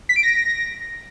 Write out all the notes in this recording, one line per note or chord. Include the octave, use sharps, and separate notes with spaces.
B6
D7
A#6